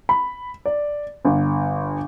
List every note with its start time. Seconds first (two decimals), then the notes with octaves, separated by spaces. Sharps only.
0.09 B5
0.66 D5
1.25 G1